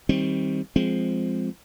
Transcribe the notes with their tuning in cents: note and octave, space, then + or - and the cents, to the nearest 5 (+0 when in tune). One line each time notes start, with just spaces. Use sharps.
D#3 +25 G3 +0 C4 +15
F3 +0 G#3 +0 C4 +0